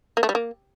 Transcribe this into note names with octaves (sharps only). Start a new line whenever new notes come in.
A#3
A3
G3
A#3